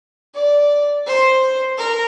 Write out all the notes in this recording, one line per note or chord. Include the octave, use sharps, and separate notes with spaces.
D5
C5
A#4